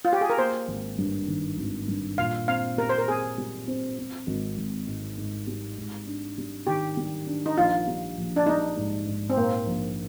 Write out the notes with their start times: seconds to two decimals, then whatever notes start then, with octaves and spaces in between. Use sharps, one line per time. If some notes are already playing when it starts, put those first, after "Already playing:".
0.05 F4
0.13 G4
0.21 G#4
0.30 A#4
0.37 A#3 C5
0.68 G#1
0.98 G2
1.27 D#3
1.58 G#1
1.88 G2
2.18 A#2 F5
2.48 C4 F5
2.78 G3 A#4
2.89 C5
2.98 A#4
3.08 C4 G#4
3.38 G3
3.67 C4
3.98 C4
4.27 G#1
4.57 G#1
4.88 G#2
5.18 G#2
5.47 G3
5.78 G#2
6.07 D4
6.38 G3
6.67 D#3 G4
6.97 G3
7.27 D4
7.46 D#4
7.58 A#1 F4
7.88 G3
8.17 A#1
8.36 D4
8.46 G3 D#4
8.77 G#2
9.07 G#2
9.30 C4
9.36 A#2 A#3
9.66 A#1